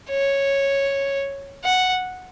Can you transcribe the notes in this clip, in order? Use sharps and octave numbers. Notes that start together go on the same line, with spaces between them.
C#5
F#5